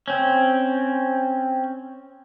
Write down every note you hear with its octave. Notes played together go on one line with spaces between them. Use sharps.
C4 C#4